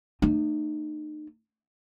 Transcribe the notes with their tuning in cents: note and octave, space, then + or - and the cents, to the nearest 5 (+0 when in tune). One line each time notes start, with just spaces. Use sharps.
A3 +30 D#4 -40